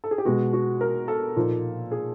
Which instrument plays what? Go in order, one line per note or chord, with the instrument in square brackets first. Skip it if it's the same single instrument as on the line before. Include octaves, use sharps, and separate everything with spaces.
[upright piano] A4
G#4
G4
B2 G#3 B3 F#4
F#4
A#4
A4
A#2 F3 A#3 D#4
G#4